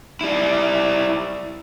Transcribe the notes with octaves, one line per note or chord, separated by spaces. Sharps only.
G3 E4